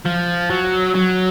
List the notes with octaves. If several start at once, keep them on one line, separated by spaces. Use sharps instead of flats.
F3
F#3
F#3